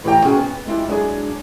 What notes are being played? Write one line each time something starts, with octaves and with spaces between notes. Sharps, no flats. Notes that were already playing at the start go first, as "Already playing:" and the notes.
A2 E3 G4 D5 G5 A#5
C4 C#4 F#4 G#4
B3
G#3 C4 E4 F4 G4
F#3 G#3 D4 G#4